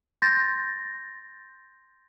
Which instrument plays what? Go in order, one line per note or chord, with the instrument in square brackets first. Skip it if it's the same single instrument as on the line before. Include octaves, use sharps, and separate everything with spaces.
[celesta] C6 G6 A6 A#6